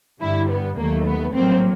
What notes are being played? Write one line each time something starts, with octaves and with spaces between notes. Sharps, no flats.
G2 D3 G3 E4
B3
D#2 D#3 F#3 A3 A#3
B3
A#1 A2 F#3 A#3 C4